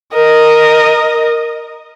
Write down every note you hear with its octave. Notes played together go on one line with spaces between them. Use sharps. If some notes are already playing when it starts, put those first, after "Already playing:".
A#4 D#5